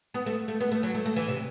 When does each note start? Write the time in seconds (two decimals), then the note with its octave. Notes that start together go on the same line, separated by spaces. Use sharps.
0.14 B3
0.26 A3
0.48 A3
0.60 B3
0.72 A3
0.83 F#3
0.94 A3
1.06 A3
1.16 E3
1.28 C3